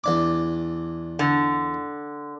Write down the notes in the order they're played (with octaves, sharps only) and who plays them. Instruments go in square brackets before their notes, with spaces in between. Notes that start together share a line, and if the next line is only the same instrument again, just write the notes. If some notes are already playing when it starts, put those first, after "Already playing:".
[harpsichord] E2 D4 D6
[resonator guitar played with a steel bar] D3